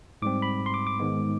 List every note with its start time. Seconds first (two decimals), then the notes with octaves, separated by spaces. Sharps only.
0.22 G#2 G3 C4 D6
0.42 B5
0.66 C6
0.74 D6
0.87 D6
0.99 G#2 D#3 G#3 B3